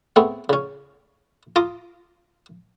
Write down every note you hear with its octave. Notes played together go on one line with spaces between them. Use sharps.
A3 B3 C4 G#4
C#3 C#4
F4 A#5 C6 D6 D#6